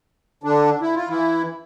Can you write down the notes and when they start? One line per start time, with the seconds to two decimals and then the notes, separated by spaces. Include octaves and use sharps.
0.43 D3 D4
0.81 E4
0.95 F4
1.09 E3 E4